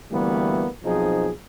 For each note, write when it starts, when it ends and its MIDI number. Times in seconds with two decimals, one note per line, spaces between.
0.11 0.68 38
0.11 0.68 52
0.11 0.68 55
0.11 0.68 58
0.11 0.68 59
0.84 1.30 35
0.84 1.30 53
0.84 1.30 60
0.84 1.30 63
0.84 1.30 68